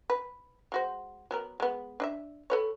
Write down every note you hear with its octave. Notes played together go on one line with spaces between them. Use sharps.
B4
G#3 F#4 C5
F#3 B3 A#4
G#3 B3
D4 D#5 E5
A4 B4 C#5